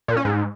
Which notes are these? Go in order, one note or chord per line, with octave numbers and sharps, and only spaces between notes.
A#2
C#4
G#2